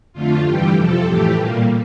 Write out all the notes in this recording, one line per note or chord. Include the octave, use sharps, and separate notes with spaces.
F2 D3 A3 F4
G2 E3 G3 G4
F2 C3 F3 A4
A2 E3 A3 G4
A#2 G3 A#3